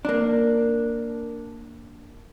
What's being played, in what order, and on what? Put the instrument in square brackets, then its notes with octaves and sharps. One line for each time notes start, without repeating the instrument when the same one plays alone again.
[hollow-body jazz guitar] A#3 D4